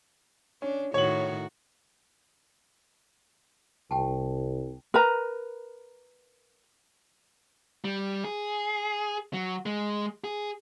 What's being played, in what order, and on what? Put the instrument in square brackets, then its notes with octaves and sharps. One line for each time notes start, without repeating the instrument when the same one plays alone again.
[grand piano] C#4 [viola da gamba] D4
[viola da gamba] A2 D#3 F#4 [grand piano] C#5 F#7
[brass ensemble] C2 [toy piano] G4 G5 A5
[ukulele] A#4 B4 A#5
[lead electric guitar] G3
G#4
F#3
G#3
G#4